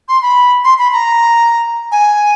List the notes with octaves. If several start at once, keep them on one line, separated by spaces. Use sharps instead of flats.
C6
B5
C6
B5
A#5
G#5